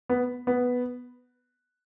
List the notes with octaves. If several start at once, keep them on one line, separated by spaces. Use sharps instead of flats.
B3
B3